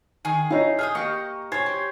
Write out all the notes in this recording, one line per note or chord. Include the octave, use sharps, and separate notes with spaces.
D#3 G#4
D#4 E4 C#5 D#5 F5
G#4 G5 D#6 F6
A#3 G4 D#5 C#6
C5 C#5 G#5 G#6
G4